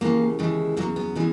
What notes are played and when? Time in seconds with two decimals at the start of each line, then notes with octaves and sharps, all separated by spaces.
0.01 D#2 C#3 E3 G#3 A#3
0.39 D#2 C#3 E3 G#3
0.77 E2 C#3 F#3 A#3
0.96 B3
1.15 C#3 E3 G#3